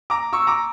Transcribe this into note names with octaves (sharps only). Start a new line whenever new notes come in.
A#5 D6
C#6 E6
A#5 D6